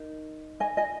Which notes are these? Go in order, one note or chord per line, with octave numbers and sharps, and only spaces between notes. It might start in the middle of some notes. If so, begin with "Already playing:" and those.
Already playing: D#4 A#4
D#5 G#5
D#5 G#5